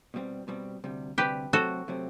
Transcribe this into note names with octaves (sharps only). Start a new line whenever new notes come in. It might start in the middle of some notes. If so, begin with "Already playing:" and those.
B2 G3 C4
B2 G3 C4
D2 C3 G3
D2 C3 G3 G4 B4
C3 F#3 A3 C4 F#4 A4
C3 F#3 A3 C4